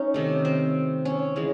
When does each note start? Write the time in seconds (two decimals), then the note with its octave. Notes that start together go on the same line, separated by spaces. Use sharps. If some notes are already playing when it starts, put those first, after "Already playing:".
Already playing: C#4 D#4
0.14 C3 D#3 A3
0.45 C4
1.05 C#4
1.36 C#3 E3 G#3